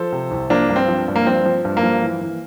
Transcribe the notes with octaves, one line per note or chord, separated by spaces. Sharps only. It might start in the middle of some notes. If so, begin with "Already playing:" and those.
Already playing: F3 A4 C5
C3
C2
F3 A#3 D4
G2
C4
F3
G2
A#3
F3 C4
F3
G2
A#3
F3
E3
E3